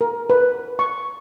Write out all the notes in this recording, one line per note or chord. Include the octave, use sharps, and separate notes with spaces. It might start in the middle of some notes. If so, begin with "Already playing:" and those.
A#4
B4
C#6